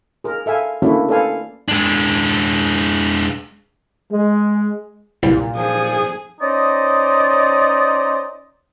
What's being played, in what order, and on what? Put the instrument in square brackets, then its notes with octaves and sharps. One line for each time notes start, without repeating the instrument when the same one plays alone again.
[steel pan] G#4 A#4
A4 E5 F5 G#5
A3 A#3 C#4 D4 E4 F#4
A4 B4 D5 F5 G#5
[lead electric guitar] G#3 D4
[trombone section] G#3
[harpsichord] C2 G3 [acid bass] A#2
[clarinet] F3 [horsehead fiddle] G#4
[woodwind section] C#4 D#4 C5 D5 D#5